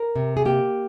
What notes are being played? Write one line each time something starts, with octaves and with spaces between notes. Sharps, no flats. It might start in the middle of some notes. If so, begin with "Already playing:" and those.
Already playing: A#4
C3
G#4
A#3 G4